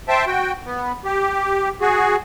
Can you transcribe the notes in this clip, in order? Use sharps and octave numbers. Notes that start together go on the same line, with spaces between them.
C5 E5 G5 A5
F#4 G5
B3
G4
F#4 G#4